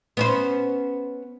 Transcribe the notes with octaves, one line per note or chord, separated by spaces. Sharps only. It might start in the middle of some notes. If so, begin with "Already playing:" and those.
B3 C#4 C5